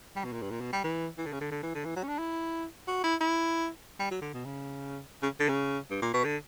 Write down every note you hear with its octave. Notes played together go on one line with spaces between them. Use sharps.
G3
B2
A#2
G2
A#2
B2
G3
E3
E3
D3
C#3
D3
D3
E3
D3
E3
F#3
C#4
D4
E4
F#4
E4
E4
G3
F#3
D3
B2
C#3
C#3
D3
C#3
G2
A#2
B2
D3